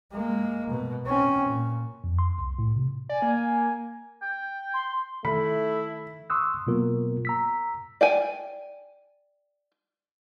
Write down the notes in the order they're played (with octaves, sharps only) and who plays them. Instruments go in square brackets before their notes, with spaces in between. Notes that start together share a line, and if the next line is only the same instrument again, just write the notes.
[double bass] G#3 A#3
B2
C4 C#4
A#2
[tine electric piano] F2
C6
C2
A2
C3
[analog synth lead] D5 [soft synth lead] G#5
[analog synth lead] A#3
[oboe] G5
[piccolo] C6
[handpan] D#3 [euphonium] A3 [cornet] E4 [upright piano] B5
[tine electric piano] C6 C#6 D#6 E6 F#6
B2 F#3 A#3 B3 F4 A#4
A#5 E6 B6
[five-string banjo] D5 G5 G#5